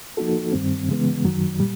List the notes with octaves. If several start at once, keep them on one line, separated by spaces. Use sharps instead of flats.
F3 A#3 D#4 F#4 A4
G2 D#3 G3 C4
C#3 E3 G#3 B3
F#2 D#3 F#3
A#2 G3